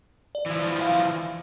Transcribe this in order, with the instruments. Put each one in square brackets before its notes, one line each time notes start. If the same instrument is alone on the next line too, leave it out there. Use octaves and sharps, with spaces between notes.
[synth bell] D5
[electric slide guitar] E3 F3
[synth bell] F5